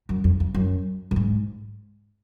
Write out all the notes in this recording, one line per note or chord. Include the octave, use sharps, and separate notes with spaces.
F#2
F2
F2
F#2
F#2
G#2